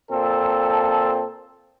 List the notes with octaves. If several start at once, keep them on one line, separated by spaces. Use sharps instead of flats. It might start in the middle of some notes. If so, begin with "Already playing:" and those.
A#2 C4 A4